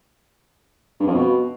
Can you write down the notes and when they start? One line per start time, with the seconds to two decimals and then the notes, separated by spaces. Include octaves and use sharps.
1.00 G2
1.07 F2
1.14 B2